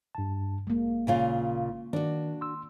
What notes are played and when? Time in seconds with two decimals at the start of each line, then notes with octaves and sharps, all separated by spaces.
0.15 G2 A5
0.67 A1 G#3 A#3
1.07 A#2 C#3 F4
1.93 D#3 D4 F#4 D5
2.41 C6 E6